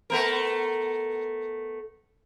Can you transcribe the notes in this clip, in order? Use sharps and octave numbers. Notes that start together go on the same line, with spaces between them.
A3 B3 A#4